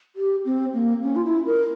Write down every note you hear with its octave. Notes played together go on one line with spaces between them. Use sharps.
G4
C4
A#3
C#4
F4
E4
A#4